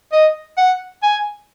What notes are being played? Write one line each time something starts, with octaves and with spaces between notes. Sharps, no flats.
D#5
F#5
G#5